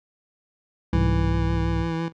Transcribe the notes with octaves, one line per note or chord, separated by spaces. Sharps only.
C2 G#2 E3